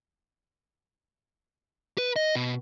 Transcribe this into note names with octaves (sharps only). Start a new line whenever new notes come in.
B4
D#5
B2